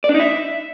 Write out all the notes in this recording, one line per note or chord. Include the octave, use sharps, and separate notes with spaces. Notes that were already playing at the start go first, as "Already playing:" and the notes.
D5
D4
D#4
E5